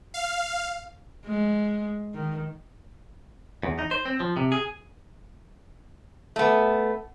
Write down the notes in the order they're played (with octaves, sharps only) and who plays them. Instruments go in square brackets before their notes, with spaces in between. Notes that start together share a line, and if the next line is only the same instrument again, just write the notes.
[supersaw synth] F5
[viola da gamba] G#3
D#3
[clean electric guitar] E2
D#4
C5
C4
F3
C3
G#4
[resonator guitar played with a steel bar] A3 B3